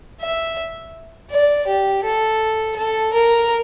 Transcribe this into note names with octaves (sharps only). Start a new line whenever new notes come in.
E5
D5
G4
A4
A4
A#4